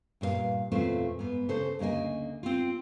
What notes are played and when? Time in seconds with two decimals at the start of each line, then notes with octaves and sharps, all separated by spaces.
0.21 G2 A#2 B4 F5
0.71 E2 A#2 A3 C4 F4 C5
1.19 G#2 B3
1.49 C#3 A4 C5
1.79 D2 C#3 A#3 D#5 G#5
2.43 C4 F4